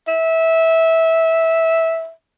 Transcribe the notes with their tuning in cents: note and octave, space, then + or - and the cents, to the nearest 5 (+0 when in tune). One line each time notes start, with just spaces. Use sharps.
E5 -15